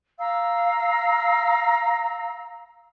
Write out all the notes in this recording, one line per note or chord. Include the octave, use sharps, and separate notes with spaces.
F5 A#5 E6